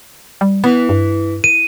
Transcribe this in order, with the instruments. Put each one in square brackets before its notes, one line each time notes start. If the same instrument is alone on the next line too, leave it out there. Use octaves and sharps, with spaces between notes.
[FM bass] G3
[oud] E3 [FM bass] B3
[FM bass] G2
[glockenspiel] D#7